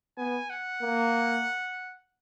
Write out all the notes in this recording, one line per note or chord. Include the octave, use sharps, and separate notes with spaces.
B3 G#5
F#5
A#3